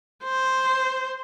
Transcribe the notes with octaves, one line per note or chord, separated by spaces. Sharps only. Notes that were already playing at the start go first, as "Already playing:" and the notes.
C5